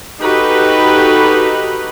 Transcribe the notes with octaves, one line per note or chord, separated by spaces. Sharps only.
D#4 F#4 G4 A4 B4